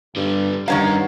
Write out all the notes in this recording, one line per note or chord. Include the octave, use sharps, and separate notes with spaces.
G2 D3 G3
G2 D#3 C#4 A#4 C#5 F5 F#5